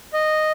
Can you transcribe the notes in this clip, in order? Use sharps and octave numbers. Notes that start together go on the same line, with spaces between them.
D#5